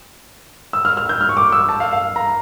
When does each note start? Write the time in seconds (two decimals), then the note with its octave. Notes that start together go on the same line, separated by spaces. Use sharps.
0.73 E6
0.85 F6
0.97 F6
1.09 G6
1.21 F6
1.29 C#6
1.37 D6
1.52 E6
1.69 A5
1.80 F5
1.93 F5
2.16 A#5